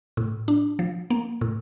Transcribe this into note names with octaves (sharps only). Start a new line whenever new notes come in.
A2
D4
F3
A#3
A2